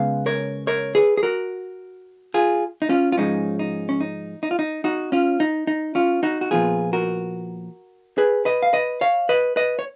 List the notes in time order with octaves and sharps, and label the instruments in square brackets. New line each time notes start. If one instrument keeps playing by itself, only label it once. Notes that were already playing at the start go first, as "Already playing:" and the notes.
Already playing: [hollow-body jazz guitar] C#3 G#3 B3 F5
A#4 C#5
A#4 C#5
G#4 B4
G#4
F#4 A#4
F4 G#4
D#4
C#4 F4
F4
G#2 F3 G#3 C#4 D#4
D#4
C#4
D#4
D#4
F4
D#4
D#4 F#4
C#4 F4
D#4
D#4
C#4 F4
D#4 F#4
F#4
A#2 F3 B3 F4 G#4
F#4 A#4
G#4 B4
B4 D#5
F5
B4 D#5
C#5 F5
B4 D#5
B4 D#5
C#5